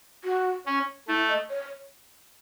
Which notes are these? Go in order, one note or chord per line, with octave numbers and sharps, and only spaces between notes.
F#4
C#4
A3 E4
D#5
C#5